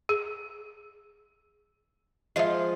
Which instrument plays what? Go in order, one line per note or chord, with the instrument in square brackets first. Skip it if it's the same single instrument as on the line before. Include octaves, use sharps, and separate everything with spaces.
[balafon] G#4
[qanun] F3 G#3 F4 [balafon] D#5 E5